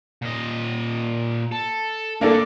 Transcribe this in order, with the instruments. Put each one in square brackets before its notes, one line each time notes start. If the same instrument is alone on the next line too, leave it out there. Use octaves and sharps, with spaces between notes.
[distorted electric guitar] A#2 D#5
A4
[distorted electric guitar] D2 G2 [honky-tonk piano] A#3 D4 A4